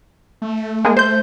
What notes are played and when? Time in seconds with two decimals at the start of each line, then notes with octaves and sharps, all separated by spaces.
0.42 A3
0.85 G#3 A#3 G#4
0.97 A3 C5 G6